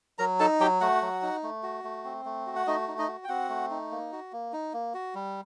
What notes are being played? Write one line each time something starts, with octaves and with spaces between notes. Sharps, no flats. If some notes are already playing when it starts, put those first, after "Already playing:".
F#3 A#4 A#5
D#4 A4 A5
F#3 G4 G5
A3 F#4 F#5
F#3
D#4
A3
F#4
A3
C4
A3
F#4
F#5
A3 D#4 D#5
D#4
D#4 D#5
F#4
G5
C4 F#4 F#5
A3
D#4
A#3
F#4
A#3
D#4
A#3
F#4
G3